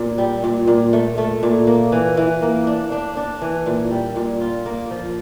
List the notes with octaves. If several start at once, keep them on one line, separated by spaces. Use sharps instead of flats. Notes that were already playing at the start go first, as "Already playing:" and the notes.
Already playing: A#2
G3
A#2
A#2
A3
A3
A#2
A#3
E3
E3
A#3
D4
D4
D4
E3
A#2
G3
A#2
F4
A#3
F3